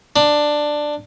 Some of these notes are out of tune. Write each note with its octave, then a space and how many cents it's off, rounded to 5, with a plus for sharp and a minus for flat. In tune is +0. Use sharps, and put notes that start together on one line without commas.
D4 +10